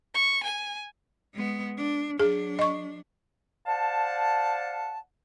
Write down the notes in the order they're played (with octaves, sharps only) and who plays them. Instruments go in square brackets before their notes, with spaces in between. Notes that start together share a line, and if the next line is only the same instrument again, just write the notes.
[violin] C#6
G#5
[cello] G#3 B3
D4
[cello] F#3 D4 [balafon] G#4
[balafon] D#5 C#6
[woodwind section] C5 D5 F5 F#5 A5